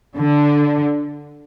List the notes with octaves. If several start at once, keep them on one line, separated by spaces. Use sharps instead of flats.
D3